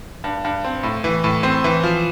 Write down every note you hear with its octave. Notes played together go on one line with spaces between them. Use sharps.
G2
G2
C4
A2
E3
A2
C4
E3
F3